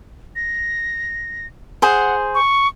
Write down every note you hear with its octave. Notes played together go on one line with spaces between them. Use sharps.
A#6
G#4 C5 F#5
C#6